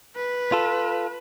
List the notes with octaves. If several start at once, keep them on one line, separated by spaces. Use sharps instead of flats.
B4
F4 A4